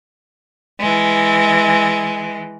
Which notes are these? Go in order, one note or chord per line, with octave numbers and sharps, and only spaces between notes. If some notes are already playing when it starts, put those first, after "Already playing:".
E3 G#3